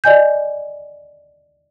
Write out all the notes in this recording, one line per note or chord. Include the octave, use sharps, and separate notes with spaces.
D5 D#5 G#5 G6